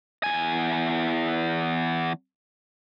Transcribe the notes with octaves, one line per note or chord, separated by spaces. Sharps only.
E2 G#5